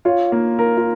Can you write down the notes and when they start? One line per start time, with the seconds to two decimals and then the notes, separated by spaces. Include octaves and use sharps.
0.05 F4 C#5
0.32 A#3
0.59 A#4
0.77 F4